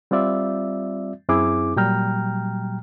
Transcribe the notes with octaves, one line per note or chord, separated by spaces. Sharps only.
G3 C4 F4 D5 E5
F#2 C4 E4 G#4 D6
A#2 F#3 G3 G5 A#5 F6